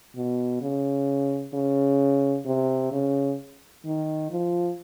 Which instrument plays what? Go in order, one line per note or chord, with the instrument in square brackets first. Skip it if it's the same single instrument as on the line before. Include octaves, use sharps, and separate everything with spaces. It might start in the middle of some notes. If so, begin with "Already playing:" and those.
[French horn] B2
C#3
C#3
C3
C#3
D#3
F3